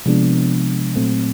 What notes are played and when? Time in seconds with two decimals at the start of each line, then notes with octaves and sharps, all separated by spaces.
0.06 C3 F3 G#3 B3 D4
0.96 A#2 F#3 A3 C4